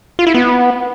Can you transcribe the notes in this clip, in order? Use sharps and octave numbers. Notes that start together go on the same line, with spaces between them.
F4
E4
B3